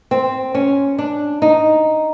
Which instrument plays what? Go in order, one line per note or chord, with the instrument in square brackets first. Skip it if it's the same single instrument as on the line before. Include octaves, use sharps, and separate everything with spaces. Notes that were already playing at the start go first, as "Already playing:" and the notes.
[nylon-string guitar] C4
C#4
D4
D#4